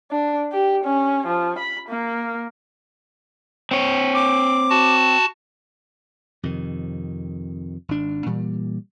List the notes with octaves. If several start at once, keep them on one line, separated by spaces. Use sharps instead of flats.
D4
G4
C#4
F3
B5
A#3
C4 C#5
D6
F#4 A5
F2 C3 D#3
G#1 D4
A#2 E3 G3